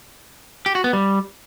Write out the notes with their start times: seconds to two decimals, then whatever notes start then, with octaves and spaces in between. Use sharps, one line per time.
0.66 G4
0.75 F#4
0.84 B3
0.93 G3